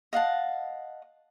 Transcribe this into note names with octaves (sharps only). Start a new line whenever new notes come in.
D#5 F5 F#5 A5